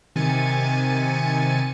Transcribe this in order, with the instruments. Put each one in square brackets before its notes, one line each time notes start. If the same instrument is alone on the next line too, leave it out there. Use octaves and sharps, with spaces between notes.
[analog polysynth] C3 D#3 G#5 A6 C#7 D#7